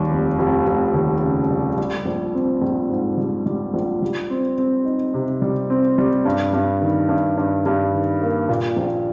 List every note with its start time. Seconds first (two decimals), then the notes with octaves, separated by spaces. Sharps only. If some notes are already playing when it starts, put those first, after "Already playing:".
Already playing: D#2 G3
0.11 F1
0.39 F1
0.67 F1
0.94 D#2
1.22 C#3
1.51 G3
1.78 G3
2.06 A#1
2.34 C4
2.62 A#1
2.89 G#2
3.18 G3
3.46 G3
3.74 A#1
4.02 G3
4.30 C4
4.58 C4
4.85 D#4
5.14 C3
5.42 G3
5.70 C4
5.98 G3
6.25 G2
6.53 G2
6.82 D#3
7.09 G2
7.37 G2
7.66 G2
7.93 D#3
8.21 A#3
8.49 A#2
8.77 A#1